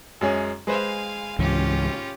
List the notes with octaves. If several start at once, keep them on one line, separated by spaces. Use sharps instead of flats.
F#2 G#3 C#4
G#3 B4 C5 F5 G#5
C#2 G#2 E3 C#4 F4 G4